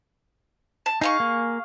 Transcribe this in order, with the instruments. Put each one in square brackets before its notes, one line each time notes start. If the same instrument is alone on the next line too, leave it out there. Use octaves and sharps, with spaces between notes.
[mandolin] A5
[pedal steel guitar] D#4 [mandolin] G#4 F5 C#6
[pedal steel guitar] A#3